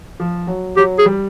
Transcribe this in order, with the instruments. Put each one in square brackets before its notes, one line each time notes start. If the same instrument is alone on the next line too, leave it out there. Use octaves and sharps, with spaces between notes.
[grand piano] F3
F#3
[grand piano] F#3 [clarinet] G4
[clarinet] G#4
[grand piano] G3